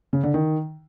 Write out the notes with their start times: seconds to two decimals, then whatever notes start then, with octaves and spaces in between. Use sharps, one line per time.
0.13 C#3
0.23 D3
0.34 D#3